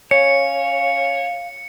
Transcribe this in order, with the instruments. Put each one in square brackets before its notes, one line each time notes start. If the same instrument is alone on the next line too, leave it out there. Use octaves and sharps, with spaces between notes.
[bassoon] C#4 [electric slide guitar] C#5 [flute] F5 [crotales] C#7